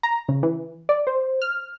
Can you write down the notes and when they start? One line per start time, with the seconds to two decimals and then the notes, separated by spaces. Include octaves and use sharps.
0.03 A#5
0.29 C#3
0.43 E3
0.89 D5
1.07 C5
1.42 F6